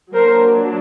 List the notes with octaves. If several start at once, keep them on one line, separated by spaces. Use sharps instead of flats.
F#3 A#3 D4 A#4 C5